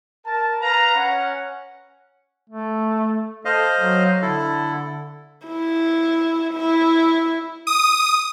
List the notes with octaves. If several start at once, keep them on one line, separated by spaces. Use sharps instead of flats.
A#4 A5
B4 F5 A#5
C#4 F#5
A3
A4 C5 D#5 F5
F#3
D3 E4 A4
E4
E4
D#6